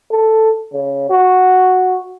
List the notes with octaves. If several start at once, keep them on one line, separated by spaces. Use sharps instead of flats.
A4
C#3
F#4